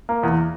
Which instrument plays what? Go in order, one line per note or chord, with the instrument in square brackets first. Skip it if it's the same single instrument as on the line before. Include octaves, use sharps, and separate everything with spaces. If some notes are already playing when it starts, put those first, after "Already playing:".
[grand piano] A#3
E2